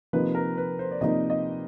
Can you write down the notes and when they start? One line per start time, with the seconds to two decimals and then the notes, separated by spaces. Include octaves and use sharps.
0.13 C3 F3 A#3 D#4 B4
0.35 A#4
0.57 B4
0.79 C5
0.91 D5
1.01 C3 F3 A#3 D#4 D#5
1.30 D#5